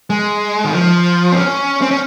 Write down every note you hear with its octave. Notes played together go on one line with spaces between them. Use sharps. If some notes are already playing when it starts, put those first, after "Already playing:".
G#3
D#3
F3
C4
C#4
C4
C#4